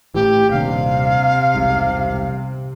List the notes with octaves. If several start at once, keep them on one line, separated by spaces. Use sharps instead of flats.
A1 A2 E3 G4
D#1 D#2 C3 D4 F5
E1 C2 G#2